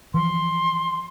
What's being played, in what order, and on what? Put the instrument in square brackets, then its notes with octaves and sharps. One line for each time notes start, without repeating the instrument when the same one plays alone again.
[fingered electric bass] E3 F3 [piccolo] C6